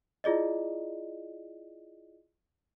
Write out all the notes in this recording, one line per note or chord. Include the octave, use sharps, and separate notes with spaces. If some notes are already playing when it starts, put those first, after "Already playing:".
E4 F4 G#4 D5 D#5